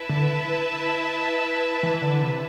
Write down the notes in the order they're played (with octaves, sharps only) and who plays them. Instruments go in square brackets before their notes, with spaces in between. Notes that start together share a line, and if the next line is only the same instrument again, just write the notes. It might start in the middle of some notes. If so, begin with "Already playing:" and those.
Already playing: [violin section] E4 B4 E5 A5
[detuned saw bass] D3
E3
D3
C3